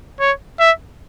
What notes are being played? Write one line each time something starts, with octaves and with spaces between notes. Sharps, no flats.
C#5
E5